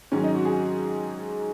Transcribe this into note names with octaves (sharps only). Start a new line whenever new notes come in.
G#2 D#3 F#3 C#4
D#4
F#4
G#4